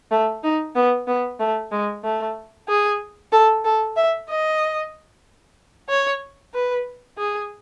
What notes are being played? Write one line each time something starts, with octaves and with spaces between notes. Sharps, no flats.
A3
D#4
B3
B3
A3
G#3
A3
G#4
A4
A4
E5
D#5
C#5
B4
G#4